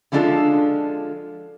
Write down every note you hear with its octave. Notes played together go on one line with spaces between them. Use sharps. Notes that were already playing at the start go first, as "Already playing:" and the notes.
D3 F3 G#3 D4 F4 A4